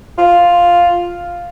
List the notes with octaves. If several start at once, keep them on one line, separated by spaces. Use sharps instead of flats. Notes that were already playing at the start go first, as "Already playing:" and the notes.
F4